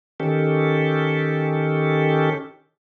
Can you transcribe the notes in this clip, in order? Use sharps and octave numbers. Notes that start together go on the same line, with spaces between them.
D#3 C#4 G4 A4